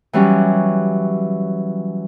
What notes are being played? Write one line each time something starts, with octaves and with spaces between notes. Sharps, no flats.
E3 F#3 G3 C#4